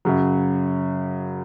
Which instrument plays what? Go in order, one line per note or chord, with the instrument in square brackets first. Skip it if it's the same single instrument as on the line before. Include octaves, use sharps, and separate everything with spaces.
[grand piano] F#2 C#3 F#3